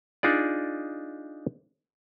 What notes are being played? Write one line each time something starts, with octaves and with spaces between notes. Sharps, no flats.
D4 D#4 F4 G#4 D5